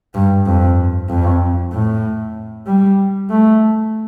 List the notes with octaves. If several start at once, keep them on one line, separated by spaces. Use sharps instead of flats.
G2
F2
F2
A2
G3
A3